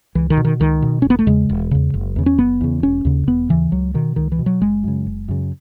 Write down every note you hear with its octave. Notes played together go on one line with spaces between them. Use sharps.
C#2 E3
D#3
B2
D#3
C#2 D#3
B2
E1 C#4
B3
A3
E2 C#3 G#3
E1
E2 C#3
F#1
E2 C#3
C#4
F#1 B3
E2 C#3
E1 C#4
D#2 C#3
E1 B3
D#2 C#3 E3
C#2 F#3
B2 D#3
C#2 D#3
E3
B2
F#3
F#1 G#3
F#2 C#3
F#1
F#2 C#3